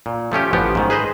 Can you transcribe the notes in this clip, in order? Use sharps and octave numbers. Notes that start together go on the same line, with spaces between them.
A#2
F3 A3 C#4 G4
A1 F3 B3 G4
G#2 D#3
G#4 B4 C5 D#5